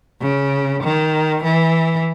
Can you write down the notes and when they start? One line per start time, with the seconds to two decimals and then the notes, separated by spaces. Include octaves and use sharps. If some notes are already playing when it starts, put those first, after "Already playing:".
0.21 C#3
0.83 D#3
1.44 E3